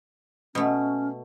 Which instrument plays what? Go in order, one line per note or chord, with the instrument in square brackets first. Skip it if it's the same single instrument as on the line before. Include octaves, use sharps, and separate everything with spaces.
[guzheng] B2 A3 [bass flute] C#4